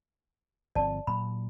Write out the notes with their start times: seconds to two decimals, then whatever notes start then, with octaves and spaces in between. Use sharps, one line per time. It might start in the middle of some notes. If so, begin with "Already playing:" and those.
0.75 G1 F3 C4 D5 A5
1.07 A#2 F#3 B5